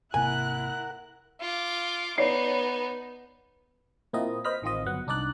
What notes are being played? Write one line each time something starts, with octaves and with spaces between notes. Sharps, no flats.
G#1 C3 A#3 E4 A#4 F#5 G#5 F#6
F4 D6
B3 D#4 C#5 D5 C7
A#2 A#3 C4 E4 D#5
B4 C5 D#5 B5 F6 B6
A1 D#3 C4 F4 D#5
G1 F#3 B3 F#5
C2 D4 D#4 D5 F#6